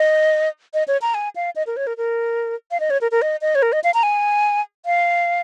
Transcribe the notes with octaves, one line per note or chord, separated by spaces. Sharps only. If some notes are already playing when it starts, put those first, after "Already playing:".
Already playing: D#5
D#5
C#5
A#5
G#5
F5
D#5
A#4
C#5
A#4
A#4
F5
D#5
C#5
A#4
A#4
D#5
D#5
C#5
A#4
D#5
F5
A#5
G#5
F5